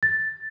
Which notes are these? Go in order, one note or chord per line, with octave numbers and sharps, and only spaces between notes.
A6